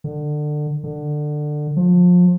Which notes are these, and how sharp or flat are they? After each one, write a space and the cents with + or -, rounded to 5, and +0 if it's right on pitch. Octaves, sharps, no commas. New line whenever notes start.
D3 +25
D3 +20
F3 +30